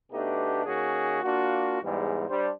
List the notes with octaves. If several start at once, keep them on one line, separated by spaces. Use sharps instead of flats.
B2 A3 B3 D4 D#4 G4
D#3 A#3 C#4 F#4 G#4
A#3 D4 F4 F#4
E2 G#2 G3
G3 D4 C5